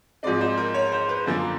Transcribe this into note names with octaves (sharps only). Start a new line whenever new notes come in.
G#2 F3 G#3 C4 D#4 D5
C5
A#4
C#5
C5
B4
F#2 D3 F3 A#3 C5